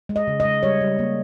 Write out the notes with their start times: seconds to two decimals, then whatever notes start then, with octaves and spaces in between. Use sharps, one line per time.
0.09 G#3
0.16 D#5
0.27 C#3
0.40 D#5
0.45 G#3
0.63 G3 C#5
0.81 G3
0.99 A#3